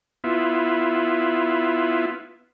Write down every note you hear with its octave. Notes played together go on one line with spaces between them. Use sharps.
B3 E4 F4